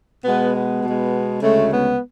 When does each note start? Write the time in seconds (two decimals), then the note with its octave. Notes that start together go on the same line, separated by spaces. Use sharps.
0.25 B2 G#3 B3
0.54 B3
0.83 B2 G#3
1.41 D2 C#3 G#3 A3
1.71 B3